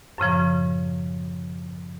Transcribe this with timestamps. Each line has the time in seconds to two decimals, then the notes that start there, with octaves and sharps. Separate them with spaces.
0.18 F#2 A2 C#3 F3